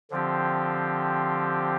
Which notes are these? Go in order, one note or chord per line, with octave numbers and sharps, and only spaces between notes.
D3 F3 C4 G4